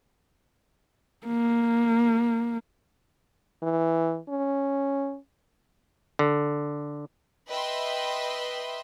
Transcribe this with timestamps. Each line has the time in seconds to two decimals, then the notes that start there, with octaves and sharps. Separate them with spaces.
1.27 A#3
3.63 E3
4.29 C#4
6.19 D3
7.48 B4 D#5 E5 G5 B5 C6